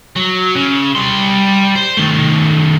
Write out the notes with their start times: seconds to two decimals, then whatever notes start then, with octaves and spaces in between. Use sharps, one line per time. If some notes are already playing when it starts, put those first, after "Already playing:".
0.16 F#3
0.56 C#3
0.95 G3 C6
1.75 C5
1.97 D#3 A3